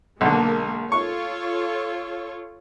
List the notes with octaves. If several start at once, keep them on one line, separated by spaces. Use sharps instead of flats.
B1 D3 G#3 A#3 A#4
F4 A4 C#5 C#6